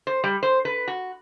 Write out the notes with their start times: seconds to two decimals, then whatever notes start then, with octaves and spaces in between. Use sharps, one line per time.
0.07 C5
0.24 G3
0.43 C5
0.65 B4
0.88 F#4